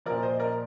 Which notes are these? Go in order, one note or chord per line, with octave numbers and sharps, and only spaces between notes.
A#2 F3 A#4 D5
C5 D#5
A#4 D5